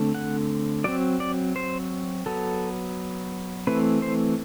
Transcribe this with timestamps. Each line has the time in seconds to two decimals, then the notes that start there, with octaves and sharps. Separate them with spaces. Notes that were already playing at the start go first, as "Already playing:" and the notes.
Already playing: D3 A3 C4
0.15 F#5
0.84 F#3 C4 D5
1.20 D5
1.56 C5
2.26 F#3 B3 A4
3.67 E3 A3 C4 B4
4.02 C5